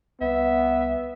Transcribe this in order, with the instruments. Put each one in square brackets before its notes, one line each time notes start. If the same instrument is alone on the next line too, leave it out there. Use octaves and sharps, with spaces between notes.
[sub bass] C2 [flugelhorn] B3 [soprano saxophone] E5